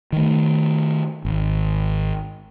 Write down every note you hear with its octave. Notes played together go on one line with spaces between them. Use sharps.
D#3 A3
G#1